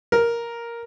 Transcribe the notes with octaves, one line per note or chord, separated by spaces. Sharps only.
A#4